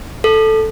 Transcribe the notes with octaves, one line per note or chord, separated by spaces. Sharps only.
A4